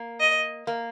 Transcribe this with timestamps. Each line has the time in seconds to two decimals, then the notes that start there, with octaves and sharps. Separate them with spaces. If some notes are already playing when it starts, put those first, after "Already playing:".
Already playing: A#3
0.20 D#5
0.67 A#3